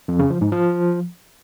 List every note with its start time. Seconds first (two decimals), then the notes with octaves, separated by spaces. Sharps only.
0.08 F2
0.19 C#3
0.30 F3
0.41 G#2
0.52 F3